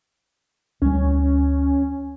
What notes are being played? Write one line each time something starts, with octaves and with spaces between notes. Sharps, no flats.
D2 G3 C#4